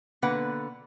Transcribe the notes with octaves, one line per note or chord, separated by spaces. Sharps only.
B2 D3 A#3 B4 F#5